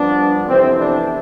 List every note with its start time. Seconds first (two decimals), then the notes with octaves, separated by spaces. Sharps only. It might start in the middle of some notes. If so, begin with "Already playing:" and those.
Already playing: G2 F3 B3 D4
0.46 F2 C3 E3 B3 C4
0.76 D4